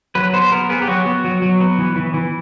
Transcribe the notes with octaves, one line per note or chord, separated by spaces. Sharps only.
F#3 B4
B3 C5
B3 A#4
B3 G#4
G4
F#3 F#4
B3
F#3
F#3
B3
E3
E3
E3